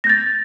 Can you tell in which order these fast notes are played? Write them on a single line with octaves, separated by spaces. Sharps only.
A#6 G6 A6